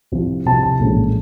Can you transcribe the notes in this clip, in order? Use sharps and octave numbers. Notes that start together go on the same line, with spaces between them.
C2 C3 F3
C2 C3 F3 A5
A5
A#1 A2 E3 G#3 C#4